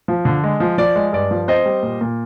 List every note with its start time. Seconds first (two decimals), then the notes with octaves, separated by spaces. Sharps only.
0.08 F3
0.25 D3
0.44 G#3
0.60 F3
0.78 F3 D5
0.96 G#3
1.13 G2 D5
1.31 F3
1.48 C4 C5 D#5
1.66 G3
1.83 A#2
2.01 A#2